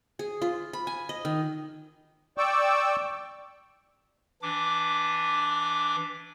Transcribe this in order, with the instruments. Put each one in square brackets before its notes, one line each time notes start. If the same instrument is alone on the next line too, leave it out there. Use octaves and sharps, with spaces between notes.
[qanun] G#4
F4
B5
G#5
D#5
D#3
[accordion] D5 G5 C#6 D6 E6
[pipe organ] E3 D4 D6